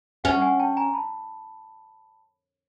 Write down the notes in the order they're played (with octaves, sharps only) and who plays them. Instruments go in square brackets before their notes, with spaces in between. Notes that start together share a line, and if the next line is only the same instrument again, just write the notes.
[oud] C#4 [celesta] E5 F#5
[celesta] F#5 G#5
G5 A5
G#5 A#5
A5 B5